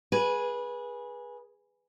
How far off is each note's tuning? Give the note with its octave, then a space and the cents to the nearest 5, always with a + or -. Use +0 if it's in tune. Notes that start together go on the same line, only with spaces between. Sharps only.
G#4 +0 B4 -20 G#5 +0